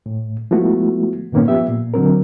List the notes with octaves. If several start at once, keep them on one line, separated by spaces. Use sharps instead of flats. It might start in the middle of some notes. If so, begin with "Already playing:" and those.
A2
F3 G#3 A3 B3 E4 F#4
G2 A#2 D#3 A#3 B3 C#4
F3 B3 G4 E5
A#2
D3 F#3 C4 A#4